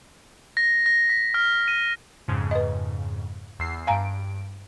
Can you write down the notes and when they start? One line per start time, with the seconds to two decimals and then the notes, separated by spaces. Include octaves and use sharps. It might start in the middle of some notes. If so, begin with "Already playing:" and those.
0.57 A#6
0.86 A#6
1.09 B6
1.34 F6
1.68 D#7
2.28 F2 G#2 C#3
2.51 B4 D#5
3.59 E2 E6 C7
3.87 G2 F5 G#5 A#5 D7